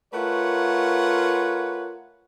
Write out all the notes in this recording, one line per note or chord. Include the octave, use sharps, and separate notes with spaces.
A3 F4 A#4 B4 C#5 F#5